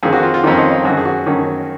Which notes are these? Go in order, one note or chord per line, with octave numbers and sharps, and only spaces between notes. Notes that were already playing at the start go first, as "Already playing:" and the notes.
F2 D#3 G#4
F#4
F4
F4
F2 D#3 D#4
C#4
D#4
D#4
F#2 D#3 F#4
G#4
F#4
F#2 D#3 C#4